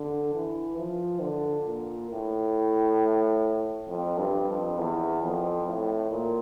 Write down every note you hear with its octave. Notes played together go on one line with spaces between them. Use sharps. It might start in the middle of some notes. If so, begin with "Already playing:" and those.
Already playing: D3
E3
F3
D3
A#2
A2
F2
G2
F2
E2
F2
A2
A#2